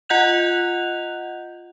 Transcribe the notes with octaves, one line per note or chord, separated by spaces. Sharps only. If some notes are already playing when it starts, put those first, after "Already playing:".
F4 D#5 F#5 F#6 G6 F7